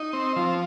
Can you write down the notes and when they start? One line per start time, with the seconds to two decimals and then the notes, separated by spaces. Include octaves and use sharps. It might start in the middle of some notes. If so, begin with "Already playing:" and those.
Already playing: D#4
0.13 C4
0.36 F3